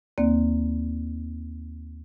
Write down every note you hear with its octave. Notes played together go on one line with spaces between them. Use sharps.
D#2 A#3 C4 D5